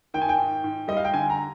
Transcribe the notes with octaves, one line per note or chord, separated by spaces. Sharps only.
D#3 G5
G#5
G5
G#2
G#2
G3 D#5
F5
G5
D3 G#5
A#5